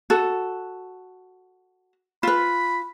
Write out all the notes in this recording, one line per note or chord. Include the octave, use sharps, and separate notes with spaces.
F#4 A4
F4 B4 B5